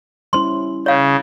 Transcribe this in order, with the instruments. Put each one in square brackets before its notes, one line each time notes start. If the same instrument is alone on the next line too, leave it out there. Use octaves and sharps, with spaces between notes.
[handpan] G3 C#4 E4 [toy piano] C5 C6
[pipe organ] C#3 [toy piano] C#5 F5